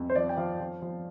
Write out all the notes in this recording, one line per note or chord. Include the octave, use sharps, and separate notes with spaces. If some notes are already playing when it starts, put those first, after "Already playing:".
Already playing: F2
C5
F3 D5
G5
F3 F5
F3
F3